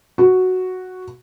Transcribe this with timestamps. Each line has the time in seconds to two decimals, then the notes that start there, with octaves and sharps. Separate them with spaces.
0.18 F#4